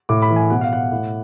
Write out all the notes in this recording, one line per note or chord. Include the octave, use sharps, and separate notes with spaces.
A2 D6
B5
E3
G#5
B2 F#5
F5
F#5
A2